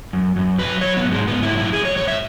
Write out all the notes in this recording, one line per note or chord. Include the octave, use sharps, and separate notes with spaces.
F#2
F#2
F#3 B4
F#3 C#5
B3
G#2
G#3
G#2 B3
E4
F#3
E4
F#3 G#4
C#5
G#2 C#5
E5